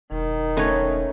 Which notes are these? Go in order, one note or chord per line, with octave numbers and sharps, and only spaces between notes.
E1 D#3
A3 C#4 D#4 B4 C#5